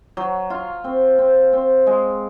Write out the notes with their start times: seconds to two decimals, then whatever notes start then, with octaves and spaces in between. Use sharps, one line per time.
0.17 F#3
0.50 F4
0.84 C4
1.18 C4
1.53 C4
1.87 G#3